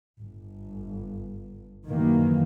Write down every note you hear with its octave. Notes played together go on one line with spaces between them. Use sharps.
G1
F#2 D#3 E3 A#3